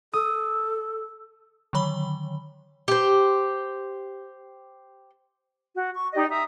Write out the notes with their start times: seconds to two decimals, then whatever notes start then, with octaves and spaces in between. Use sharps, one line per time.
0.13 A4 D#6
1.73 D3 D#3 F#3 C#5 B5 G7
2.88 G4 C5
5.75 F#4
5.95 C#6
6.13 D#4 G4 D5 D#5
6.29 E5 A#5 D#6